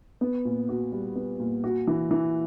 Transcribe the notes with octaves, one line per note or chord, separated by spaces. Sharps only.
B3
A#2
F#4
G3
B3
A#2
F#4
E3
E3